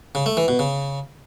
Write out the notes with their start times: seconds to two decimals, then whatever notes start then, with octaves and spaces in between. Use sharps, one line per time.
0.15 C#3
0.26 A3
0.37 E3
0.48 B2
0.59 C#3